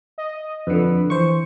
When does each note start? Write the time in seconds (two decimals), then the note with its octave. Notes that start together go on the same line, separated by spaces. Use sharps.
0.18 D#5
0.67 F2 D3 B4
1.10 E3 C5 C#6